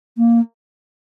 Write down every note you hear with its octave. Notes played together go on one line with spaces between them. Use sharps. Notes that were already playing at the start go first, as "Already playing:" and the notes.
A#3